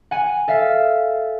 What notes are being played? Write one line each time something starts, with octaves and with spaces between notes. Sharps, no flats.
F#5 G#5
A4 E5 F5